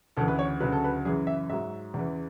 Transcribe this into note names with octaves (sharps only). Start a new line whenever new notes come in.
D2 C#3 E3 A4
B4
C#5
D2 C#3 F#3 B4
A4
B4
F#2 C#3 E3 G#4
E5
G#2 F#3 E5
E2 C#3 E3